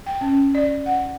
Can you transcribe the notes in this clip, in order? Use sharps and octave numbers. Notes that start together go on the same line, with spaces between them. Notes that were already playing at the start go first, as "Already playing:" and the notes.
G5
C#4
D5
F#5